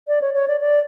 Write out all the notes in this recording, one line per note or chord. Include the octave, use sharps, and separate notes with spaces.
D5
C#5
C#5
D5
D5